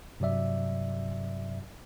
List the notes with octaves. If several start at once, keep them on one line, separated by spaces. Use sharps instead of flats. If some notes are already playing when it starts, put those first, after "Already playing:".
G2 C3 F#3 D5 E5